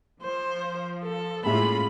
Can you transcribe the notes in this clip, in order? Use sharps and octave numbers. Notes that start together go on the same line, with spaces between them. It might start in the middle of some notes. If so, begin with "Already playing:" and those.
F3 C5
A4
A2 G#3 A#3 C#4 F4 E5 B5